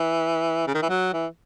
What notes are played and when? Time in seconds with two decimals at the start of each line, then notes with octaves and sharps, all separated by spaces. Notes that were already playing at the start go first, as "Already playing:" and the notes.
Already playing: E3
0.67 C#3
0.74 D#3
0.82 E3
0.89 F#3
1.14 E3